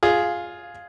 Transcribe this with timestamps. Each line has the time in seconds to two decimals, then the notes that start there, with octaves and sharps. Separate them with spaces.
0.03 F4 G#4